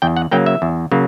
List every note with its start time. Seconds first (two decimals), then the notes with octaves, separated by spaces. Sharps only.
0.02 E2 G5
0.17 F#5
0.31 C#3 F#3 A#3 G5
0.46 E5
0.62 E2
0.92 C#3 F#3 A#3